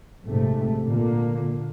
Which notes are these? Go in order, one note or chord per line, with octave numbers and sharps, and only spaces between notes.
A#1 G#2 C3 A3
A#2 D3 A#3